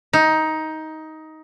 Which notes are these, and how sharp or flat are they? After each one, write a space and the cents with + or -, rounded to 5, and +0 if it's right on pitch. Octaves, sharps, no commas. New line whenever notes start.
D#4 +15